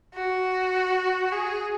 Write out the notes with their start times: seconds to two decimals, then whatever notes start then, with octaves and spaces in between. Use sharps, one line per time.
0.14 F#4
1.32 G#4